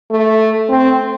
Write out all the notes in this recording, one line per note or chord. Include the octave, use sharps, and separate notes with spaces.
A3
C4